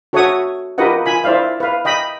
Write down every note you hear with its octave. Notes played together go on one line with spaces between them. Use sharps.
F#4 A4 C#5 E5 F#5 D#6
F4 G4 A#4 B4 D#5 F#5
F4 G#5 B5
E4 C5 D5 E5 F5
B4 F5
D#5 G5 B5